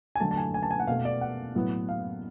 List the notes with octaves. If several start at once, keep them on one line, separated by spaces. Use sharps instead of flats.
G#5
D3 F#3 A3 A5
A5
G#5
G#5
A5
G#5
F#5
B2 A3 F5
D5
F#5
A2 F#3 B3
F5